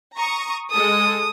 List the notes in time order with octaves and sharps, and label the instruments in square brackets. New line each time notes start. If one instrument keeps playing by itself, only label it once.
[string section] A#5 C#6 D#6
[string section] G#3 A4 [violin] D#6